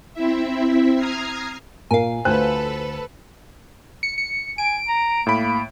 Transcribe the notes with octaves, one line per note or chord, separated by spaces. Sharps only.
C4 E4 E5
A#5 D#6 F6 G#6 C7
A#2 A#4 F5 G#5
D2 F4 A4 B4 C5 G#5 F#6
C#7
C#7
G#5 D7
A#5
A2 A#3 B5